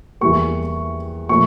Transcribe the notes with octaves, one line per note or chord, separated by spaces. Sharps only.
E2 E3 G3 A#3 C#6
A#2 F3 A3 C#6